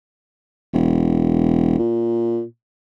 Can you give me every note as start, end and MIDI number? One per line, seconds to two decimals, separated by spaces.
0.73 1.77 28
1.79 2.43 46